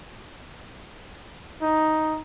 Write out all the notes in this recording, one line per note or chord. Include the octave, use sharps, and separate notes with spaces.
D#4